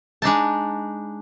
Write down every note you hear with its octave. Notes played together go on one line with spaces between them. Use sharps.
G#3 D4 D#4 A5